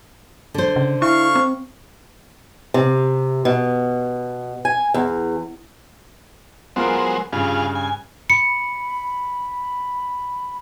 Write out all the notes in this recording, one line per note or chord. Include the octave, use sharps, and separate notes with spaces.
D3 C5
C#3
E4 F5 C#6
C4
C3
B2
G#5
E2
F#3 G#3 B3 F4 A#4 C5
G2 C#3 F4 G#4
G#5
B5 C#7